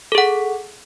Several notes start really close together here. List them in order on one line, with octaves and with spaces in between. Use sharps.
A4 G#4 F#5